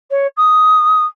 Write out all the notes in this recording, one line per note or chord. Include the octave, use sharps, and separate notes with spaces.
C#5
D#6